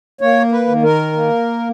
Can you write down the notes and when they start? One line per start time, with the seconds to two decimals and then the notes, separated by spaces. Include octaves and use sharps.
0.21 A#3 C#5
0.52 B4
0.67 D#3
0.83 A#4
1.13 A#3